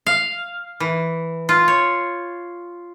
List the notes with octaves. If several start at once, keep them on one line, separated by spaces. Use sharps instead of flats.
F5
E3
F4
C#5